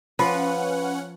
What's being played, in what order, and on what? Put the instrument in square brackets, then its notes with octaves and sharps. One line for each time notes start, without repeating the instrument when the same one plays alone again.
[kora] F3 [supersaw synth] C#4 F#5 [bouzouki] B4